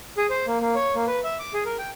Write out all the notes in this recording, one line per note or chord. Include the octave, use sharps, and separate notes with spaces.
G#4
C5
A#3
A#3
C#5
A#3
B4
E5
D6
G#4
A#4
G5